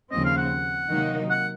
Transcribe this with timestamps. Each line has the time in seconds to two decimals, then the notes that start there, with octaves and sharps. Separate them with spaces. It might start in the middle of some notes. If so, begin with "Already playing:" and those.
0.11 D#2 C#3 F3 C4 D#5
0.25 F5
0.38 F#5
0.91 C3 D#3 F#3 A#3 D#4
1.31 F#5